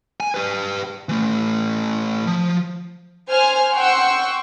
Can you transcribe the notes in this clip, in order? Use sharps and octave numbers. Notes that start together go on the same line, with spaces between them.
G#5
G4 B4
E3 A3
F3
C5 G#5 F6
F#5 G5 C6 C#6 E6